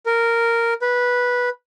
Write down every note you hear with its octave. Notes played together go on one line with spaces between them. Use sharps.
A#4
B4